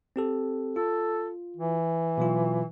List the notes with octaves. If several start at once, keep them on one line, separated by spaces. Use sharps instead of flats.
C4 G4 A4
F4 A4
E3
B2 F#3 F4